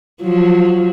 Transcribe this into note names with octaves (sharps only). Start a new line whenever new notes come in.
F3 F#3